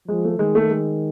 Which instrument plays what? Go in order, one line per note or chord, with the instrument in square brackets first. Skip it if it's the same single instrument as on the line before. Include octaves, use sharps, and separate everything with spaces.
[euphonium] F3 [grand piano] G#3
[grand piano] A3
[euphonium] D#3 [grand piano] G#3
[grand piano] A3
G#3